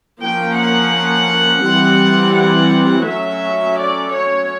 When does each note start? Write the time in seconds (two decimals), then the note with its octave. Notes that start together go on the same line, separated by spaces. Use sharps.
0.21 F3 A#3 C#4 G5
0.57 F#5
1.64 E3 G3 C4
2.34 F#5
3.05 F#3 A3 C#4 E5
3.77 D5
4.13 C#5